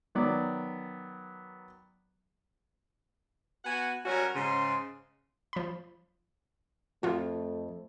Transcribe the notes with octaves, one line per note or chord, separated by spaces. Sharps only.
D#3 F#3 B3 D5
B3 F#4 F#5 G#5
F#3 G3 C#4 F#4 A#4 G#5
G#2 C#3 C6
F3 B5
F2 A3 F4 F#4